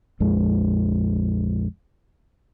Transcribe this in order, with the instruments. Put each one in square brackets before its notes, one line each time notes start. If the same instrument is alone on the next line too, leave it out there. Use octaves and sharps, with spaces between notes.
[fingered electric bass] A#1 F2 G#3